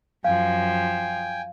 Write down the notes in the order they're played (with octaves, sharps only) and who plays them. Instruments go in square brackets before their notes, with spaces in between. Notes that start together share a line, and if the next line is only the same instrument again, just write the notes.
[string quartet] F#2 F3 [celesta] F5 [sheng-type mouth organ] G5 G#5